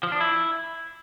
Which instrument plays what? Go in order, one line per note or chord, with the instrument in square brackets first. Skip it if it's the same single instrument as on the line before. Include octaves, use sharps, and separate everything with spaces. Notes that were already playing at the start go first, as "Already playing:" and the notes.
[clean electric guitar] F3
D4
E4